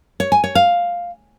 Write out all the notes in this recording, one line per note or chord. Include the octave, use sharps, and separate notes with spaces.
C#5
G#5
C#5
F5